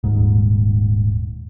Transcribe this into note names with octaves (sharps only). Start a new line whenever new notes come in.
D#1 G#2